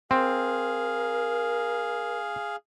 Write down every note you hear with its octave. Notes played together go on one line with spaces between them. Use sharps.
C4 G#4 A#4 F5